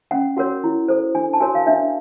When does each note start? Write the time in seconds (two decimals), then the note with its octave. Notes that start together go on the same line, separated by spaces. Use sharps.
0.11 C#4 F#5
0.37 F#4 A#4 C#5 F#5
0.64 E4
0.88 A4 C5
1.15 D4 G#5
1.33 A5
1.40 F#4 A#4 C#5 G#5
1.55 F5
1.67 D4 E5